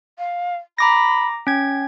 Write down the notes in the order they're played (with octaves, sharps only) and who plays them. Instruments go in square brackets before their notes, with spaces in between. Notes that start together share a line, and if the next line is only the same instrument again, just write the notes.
[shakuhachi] F5
[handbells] A#5 D6 A#6 [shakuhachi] B5
[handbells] C#4 G#6 [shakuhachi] G5